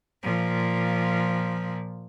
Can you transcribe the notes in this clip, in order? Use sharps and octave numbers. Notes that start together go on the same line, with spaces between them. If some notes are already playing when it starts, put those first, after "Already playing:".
A#2 F3